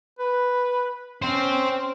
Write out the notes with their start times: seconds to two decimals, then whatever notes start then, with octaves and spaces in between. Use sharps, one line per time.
0.19 B4
1.22 C#4 C5 G5